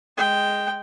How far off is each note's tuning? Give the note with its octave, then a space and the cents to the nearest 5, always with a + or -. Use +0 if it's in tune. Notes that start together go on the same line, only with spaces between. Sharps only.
G#3 +0 G5 +0